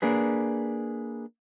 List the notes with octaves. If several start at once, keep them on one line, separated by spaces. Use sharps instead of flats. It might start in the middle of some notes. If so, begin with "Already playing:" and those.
A#3 D4 G#4 B4